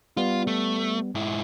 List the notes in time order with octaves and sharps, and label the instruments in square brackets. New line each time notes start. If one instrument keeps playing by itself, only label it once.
[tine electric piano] G3 B3 [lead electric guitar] F4
[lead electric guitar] A3
G#2 E4